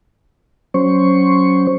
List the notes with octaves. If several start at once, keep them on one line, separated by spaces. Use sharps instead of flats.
F#3 C#4 C5 C#6